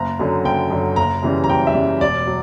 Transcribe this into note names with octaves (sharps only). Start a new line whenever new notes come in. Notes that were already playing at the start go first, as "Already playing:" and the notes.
Already playing: F#1 A#5
F#2 D3 F#3
F#1 G5
F#2 D3 F#3
F#1 A#5
F#2 C#3 E3 G3
A#5
F#1 G5
E5
F#2 C#3 E3 G3
E1 D5
F#3